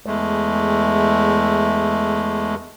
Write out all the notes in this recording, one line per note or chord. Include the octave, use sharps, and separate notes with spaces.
E2 G#3 A3